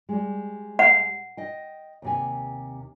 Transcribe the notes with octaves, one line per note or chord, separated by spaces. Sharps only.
G3 G#3
F#5
D#5 G5
D#2 C3 G#5